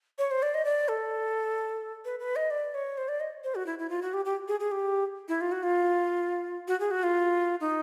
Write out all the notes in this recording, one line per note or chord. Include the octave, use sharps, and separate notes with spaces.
C#5
C5
D5
D#5
D5
A4
B4
B4
D#5
D5
C#5
C5
D5
D#5
C5
F#4
E4
E4
F4
F#4
G4
G4
G#4
G#4
G4
E4
F4
F#4
F4
F#4
G#4
F#4
F4
D#4